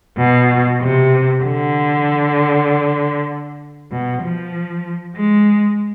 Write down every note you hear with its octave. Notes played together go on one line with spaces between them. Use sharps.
B2
C3
D3
B2
F3
G#3